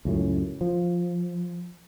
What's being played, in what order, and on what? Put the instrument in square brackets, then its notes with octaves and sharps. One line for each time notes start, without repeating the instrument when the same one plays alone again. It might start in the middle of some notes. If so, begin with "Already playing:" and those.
[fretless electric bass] C#2 F#2 A2
F3